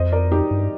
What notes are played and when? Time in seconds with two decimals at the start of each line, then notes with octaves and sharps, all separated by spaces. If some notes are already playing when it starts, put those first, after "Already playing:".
Already playing: F2 C5 D#5
0.12 A#4 D5
0.32 D#4 G4
0.51 G2